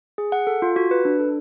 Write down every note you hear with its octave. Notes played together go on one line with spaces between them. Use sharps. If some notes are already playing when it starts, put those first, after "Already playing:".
G#4
F#5
A4
F4
F#4
B4
D4
A4